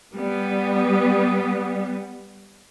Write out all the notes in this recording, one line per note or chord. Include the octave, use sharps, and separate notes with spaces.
G3 B3